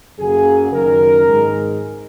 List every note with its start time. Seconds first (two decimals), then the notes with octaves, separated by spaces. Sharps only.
0.18 F#2 C#3 F#3 A#3 G#4
0.72 F#1 F#2 D#3 A#4
1.26 G#1 G#2 G#3